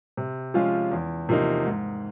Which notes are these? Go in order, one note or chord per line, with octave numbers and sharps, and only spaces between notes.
C3
F3 G#3 C#4 F4
E2
C3 F3 A#3 D#4
G#2